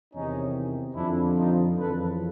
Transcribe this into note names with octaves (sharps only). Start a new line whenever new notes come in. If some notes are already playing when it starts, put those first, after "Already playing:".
E2 C3 D#3 C#4 D#4
F2 D3 F3 D4 E4
D#4 F4
F2 C#3 E3 A4 B4